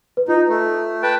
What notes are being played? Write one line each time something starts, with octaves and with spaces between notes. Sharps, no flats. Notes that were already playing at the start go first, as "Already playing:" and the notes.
B4
D#4 F4
A3
B4 G5 A5